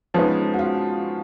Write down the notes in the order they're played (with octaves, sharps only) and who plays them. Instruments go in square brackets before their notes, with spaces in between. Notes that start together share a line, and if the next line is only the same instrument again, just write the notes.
[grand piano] F3 G#3 B3 D#4 [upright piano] C#4
[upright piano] F#4
F4